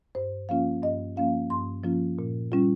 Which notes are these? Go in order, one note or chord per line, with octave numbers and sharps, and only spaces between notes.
G2 C5
F3 A#3 C#4 F4 F5
G2 D#5
F3 A#3 C#4 F4 F5
G2 C6
F3 A#3 C#4 F4
A#2
G3 C#4 F4